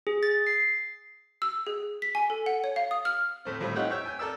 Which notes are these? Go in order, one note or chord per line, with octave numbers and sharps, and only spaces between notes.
G#4
A6
C7
E6
G#4
B6
G#5
A4
F#5
C#5
F5
D#6
F6
A2 A3 C4
A#1 A2 G3 C4
D#4 F4 G4 C#5 F#5 G5
C#5 E5 G5
G5 G#5
A4 A#4 D5 E6